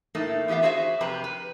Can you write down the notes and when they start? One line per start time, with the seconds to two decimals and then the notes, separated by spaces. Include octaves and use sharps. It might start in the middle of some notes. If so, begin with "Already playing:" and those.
0.15 A2 A3 A#3 D#4
0.48 E3 B3 G4 E5 F5
0.62 F#4 G#4 C5 C#5 D#5 E5
1.01 F2 C3 G4 B4 A#5
1.24 B4